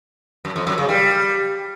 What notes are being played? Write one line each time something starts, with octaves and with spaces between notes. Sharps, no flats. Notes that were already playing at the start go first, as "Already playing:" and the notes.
F#2
F2
F#2
C#3
G3